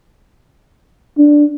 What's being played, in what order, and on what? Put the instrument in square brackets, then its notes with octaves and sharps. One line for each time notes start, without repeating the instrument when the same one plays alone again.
[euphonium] D4